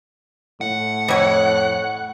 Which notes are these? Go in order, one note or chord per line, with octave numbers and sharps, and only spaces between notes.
A2 F#5
F2 C#5